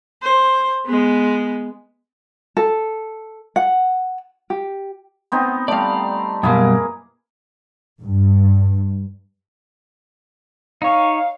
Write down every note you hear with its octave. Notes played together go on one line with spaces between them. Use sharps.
C5
G#3 B3
A4
F#5
G4
B3 C4 D#4
G3 A3 D5 F5
F#2 B2 G3 A#3 E4 G#4
G2
D#4 C#5 F5